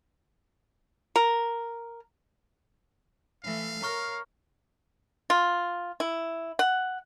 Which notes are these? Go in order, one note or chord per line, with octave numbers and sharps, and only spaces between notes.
A#4
E3 A3 F5
A#4 C#5 A#5 C#6 F6
F4
E4
F#5